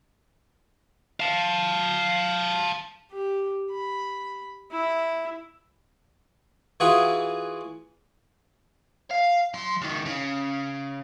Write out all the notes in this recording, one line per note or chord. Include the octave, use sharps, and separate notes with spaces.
F5 A5
G4
B5
E4
E3 F4 F#4 G#4
F5
F#3 C6
C#2 D#3
C#3